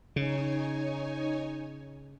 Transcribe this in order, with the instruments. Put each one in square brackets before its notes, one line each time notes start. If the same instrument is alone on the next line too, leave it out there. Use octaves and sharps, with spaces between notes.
[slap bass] C#3 [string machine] D#4 C#5 G#5